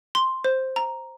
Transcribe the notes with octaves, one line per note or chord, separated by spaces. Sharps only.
C6
C5
A#5